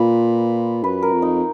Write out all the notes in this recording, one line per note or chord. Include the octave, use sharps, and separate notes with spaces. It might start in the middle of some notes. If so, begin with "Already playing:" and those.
Already playing: A#2 F4 B4
F#2 B4
A#4
F2
D#4